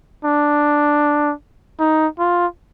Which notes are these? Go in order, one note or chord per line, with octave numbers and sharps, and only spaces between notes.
D4
D#4
F4